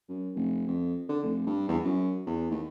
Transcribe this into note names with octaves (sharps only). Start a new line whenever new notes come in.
F#2
F1
F2
D3
F1
G2
E2
F#2
E2
D#2